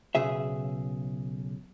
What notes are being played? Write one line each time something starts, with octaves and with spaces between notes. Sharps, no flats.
B1 C#3 G#4 E5